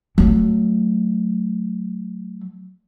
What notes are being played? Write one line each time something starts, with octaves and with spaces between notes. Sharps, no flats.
F#3 A3